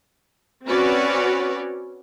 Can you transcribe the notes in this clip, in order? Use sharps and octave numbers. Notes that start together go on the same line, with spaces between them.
C4 C#4 F#4 B4 C#5 D5